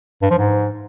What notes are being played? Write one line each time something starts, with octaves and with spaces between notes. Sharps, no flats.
G2
F3
G#2